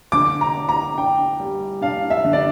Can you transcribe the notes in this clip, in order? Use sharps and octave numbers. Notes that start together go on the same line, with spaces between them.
D3 D6
A#5
D4
A#5
D4 G5
G3
D4 F5
E5
D3
D5